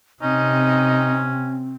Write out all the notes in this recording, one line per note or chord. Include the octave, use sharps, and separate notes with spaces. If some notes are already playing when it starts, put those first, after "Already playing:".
C3 C4 C#4 D#4